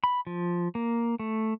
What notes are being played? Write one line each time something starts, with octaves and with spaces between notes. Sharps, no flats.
B5
F3
A#3
A3